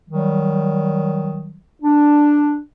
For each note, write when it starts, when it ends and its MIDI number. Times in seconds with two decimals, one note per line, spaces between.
0.09 1.58 51
0.09 1.58 54
0.09 1.58 55
1.82 2.58 62